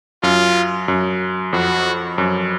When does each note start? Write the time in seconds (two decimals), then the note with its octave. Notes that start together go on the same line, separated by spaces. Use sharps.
0.23 F#2 F4
0.88 F#2
1.53 F2 F#4
2.18 F#2